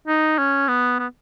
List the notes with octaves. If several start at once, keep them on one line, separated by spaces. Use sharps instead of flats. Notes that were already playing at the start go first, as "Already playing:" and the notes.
D#4
C#4
B3
B3